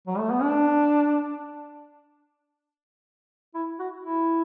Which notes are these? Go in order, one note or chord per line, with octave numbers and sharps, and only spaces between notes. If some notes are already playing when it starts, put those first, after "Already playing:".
F#3
A3
B3
D4
E4
F#4
E4